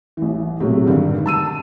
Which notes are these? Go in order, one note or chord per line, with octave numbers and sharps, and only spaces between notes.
A1 E3
C3 F#3 G#3 A3
G2 D3 D#3
A5 E6 D#7